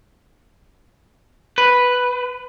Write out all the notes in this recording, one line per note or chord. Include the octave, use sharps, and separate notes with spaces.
B4